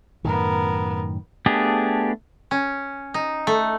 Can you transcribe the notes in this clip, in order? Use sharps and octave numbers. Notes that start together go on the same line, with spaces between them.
F#2 A2 D#3 B3 A#4
A3 B3 D4 G4 G#4
C#4
D#4
A3